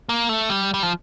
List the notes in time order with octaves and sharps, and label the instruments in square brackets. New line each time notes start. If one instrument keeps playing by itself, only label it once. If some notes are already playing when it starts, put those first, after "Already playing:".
[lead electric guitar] A#3
A3
G3
G3
F3